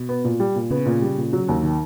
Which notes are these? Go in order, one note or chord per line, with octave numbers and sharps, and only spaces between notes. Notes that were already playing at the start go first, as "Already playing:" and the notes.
Already playing: B2
B3
A#2
G3
A#2
C#3 B3
A#2
G3
A#2
F#3
D#2
D#3